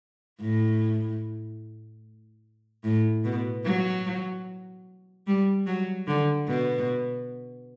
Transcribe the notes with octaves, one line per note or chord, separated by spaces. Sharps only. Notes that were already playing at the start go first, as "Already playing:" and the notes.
A2
A2
B2
F#3
G3
F#3
D3
B2